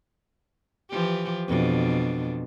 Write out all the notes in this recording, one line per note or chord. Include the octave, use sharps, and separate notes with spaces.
E3 F3 G4
F2 B2 D4